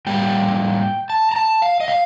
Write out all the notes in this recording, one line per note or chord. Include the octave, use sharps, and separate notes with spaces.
A2 G3 A#3 G5
A5
A#5
A5
F5
D#5
F5